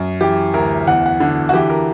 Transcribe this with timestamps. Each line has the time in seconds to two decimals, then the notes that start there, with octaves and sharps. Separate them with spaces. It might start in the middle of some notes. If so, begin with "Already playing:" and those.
Already playing: F#2
0.21 E3 G4
0.53 D2 A#4
0.87 E2 F#5
1.06 F#5
1.20 D3
1.49 F#4
1.53 E3 G4
1.70 A#4